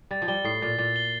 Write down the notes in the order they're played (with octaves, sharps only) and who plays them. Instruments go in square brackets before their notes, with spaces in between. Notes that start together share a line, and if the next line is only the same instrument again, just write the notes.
[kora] G3 [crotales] A6
[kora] F3
[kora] G3 [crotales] G7
[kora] A2 [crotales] C7
[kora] A#2 [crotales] A6
[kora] A#2 [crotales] A6
[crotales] G7